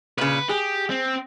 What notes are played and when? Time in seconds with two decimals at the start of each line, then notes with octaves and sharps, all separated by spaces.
0.18 A#2 C#3 B4
0.49 G4 G#4
0.90 C4